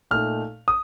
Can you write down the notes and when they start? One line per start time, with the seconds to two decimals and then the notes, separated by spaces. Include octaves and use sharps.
0.11 A#2 A3 D#4 F6
0.68 D#6